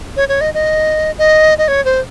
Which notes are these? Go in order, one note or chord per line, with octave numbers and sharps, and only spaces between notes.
C#5
C#5
D#5
D#5
D#5
D#5
C#5
C5